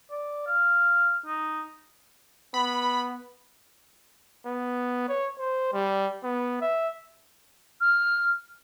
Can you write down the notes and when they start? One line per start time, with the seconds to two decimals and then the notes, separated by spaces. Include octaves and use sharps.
0.11 D5
0.47 F5
1.26 D#4
2.54 B3 B5
4.46 B3
5.08 C#5
5.38 C5
5.73 G3
6.23 B3
6.61 E5
7.81 F6